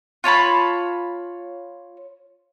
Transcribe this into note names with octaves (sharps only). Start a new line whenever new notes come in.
F4 C#5 A5 B5